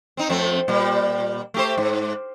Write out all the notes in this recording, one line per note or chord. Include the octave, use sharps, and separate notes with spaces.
C4 D#4
F2 A3 C4
A#2 G3
A3 G4 C5
G#2